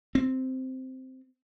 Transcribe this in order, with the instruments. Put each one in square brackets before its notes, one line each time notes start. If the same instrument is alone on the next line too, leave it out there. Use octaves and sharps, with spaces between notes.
[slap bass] C4